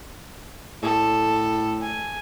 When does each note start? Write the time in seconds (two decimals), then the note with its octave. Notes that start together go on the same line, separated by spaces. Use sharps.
0.83 A2 A4
1.81 G#5